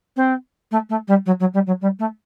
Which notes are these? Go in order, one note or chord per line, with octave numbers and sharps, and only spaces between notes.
C4
A3
A3
G3
F#3
F#3
G3
F#3
G3
A3